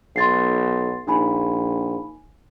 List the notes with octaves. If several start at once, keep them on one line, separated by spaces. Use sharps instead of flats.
B1 C6 A6 C7
A#1 D#4 G#5 B5